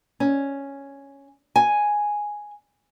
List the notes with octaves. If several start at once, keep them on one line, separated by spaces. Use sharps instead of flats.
C#4
G#5